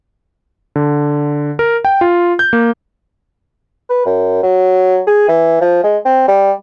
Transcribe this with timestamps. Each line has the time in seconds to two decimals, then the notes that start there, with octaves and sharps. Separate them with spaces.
0.76 D3
1.59 A#4
1.85 G5
2.01 F4
2.39 G6
2.53 A#3
3.89 B4
4.06 F#2
4.43 F#3
5.07 G#4
5.28 E3
5.61 F3
5.84 G#3
6.05 C4
6.28 G3